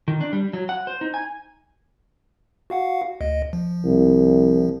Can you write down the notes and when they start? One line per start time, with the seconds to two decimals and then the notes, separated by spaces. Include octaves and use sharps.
0.08 D#3
0.21 D4
0.33 G3
0.53 F#3
0.69 F#5
0.87 C5
1.01 D#4
1.14 G#5
2.70 F#4 F5 F#5
3.21 D2 D#5
3.53 F3
3.84 C2